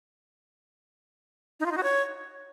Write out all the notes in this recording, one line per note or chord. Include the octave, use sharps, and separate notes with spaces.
D#4
F4
D#4
F#4
C#5